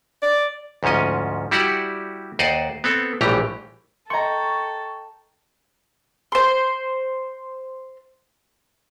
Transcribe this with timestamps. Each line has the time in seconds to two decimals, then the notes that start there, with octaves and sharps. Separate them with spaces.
0.22 D5
0.83 D2 G#2 F3 C#4 D#5
1.51 G3 E4 F#4 G4 D5 F#5
2.39 D#2 C5 D5 D#5 F#5
2.84 B3 C4 A4
3.21 A#1 A2 E3 G3 G4 A#5
4.10 A4 D#5 G5 A#5 C6 C#6
6.32 C5 C6